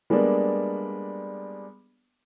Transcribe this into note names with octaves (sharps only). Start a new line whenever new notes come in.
G3 G#3 A#3 B3 D4 D5